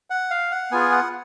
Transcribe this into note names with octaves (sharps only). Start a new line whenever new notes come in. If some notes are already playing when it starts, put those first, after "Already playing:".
F#5
F5
F#5
B3 F4 G#4 G#5
F#5